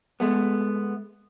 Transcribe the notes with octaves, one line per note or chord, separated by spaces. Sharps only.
G#3 A3 B3